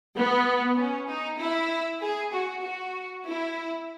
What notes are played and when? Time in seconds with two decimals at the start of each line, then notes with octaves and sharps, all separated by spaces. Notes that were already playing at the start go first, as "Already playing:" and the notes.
0.15 B3
0.77 C#4
1.08 D#4
1.39 E4
2.01 G#4
2.32 F#4
2.64 F#4
3.26 E4